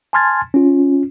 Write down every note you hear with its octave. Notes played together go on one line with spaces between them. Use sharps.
G#5 A5 C6 F6 G#6 A6
C#4 F4